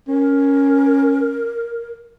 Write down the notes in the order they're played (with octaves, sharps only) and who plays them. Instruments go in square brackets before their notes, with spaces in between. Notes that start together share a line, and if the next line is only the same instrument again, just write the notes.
[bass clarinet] C#4 [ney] A#4